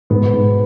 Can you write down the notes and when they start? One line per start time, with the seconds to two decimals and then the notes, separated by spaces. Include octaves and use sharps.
0.10 G#2 B2 B3
0.34 G#2